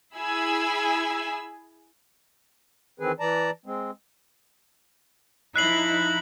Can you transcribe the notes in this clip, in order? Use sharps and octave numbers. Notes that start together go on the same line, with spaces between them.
E4 G#4 G#5 B5 E6
D#3 E3 C4 G#4 B4
E3 D5 A5 A#5
G#3 C4
F3 D#4 E4 F#6 C7 F#7